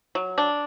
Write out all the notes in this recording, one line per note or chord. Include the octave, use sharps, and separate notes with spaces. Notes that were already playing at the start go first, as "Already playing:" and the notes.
F#3
D4